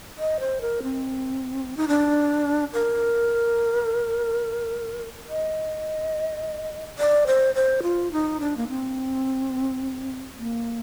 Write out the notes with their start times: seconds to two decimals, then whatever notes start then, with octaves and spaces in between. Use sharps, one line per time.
0.18 D#5
0.40 C5
0.61 A#4
0.83 C4
1.77 D#4
1.88 D4
2.73 A#4
5.29 D#5
6.99 D5
7.27 C5
7.55 C5
7.83 F4
8.12 D#4
8.40 D4
8.57 A#3
8.69 C4
10.38 A#3